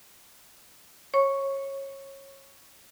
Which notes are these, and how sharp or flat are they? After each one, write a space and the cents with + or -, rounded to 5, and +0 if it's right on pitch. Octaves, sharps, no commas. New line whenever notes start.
C#5 -20 C#6 +0